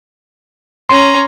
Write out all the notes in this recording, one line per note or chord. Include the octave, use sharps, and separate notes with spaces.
C#4 A#5 C6